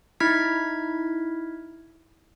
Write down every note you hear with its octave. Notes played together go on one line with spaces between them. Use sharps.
D#4 E4 F6 G#6 B6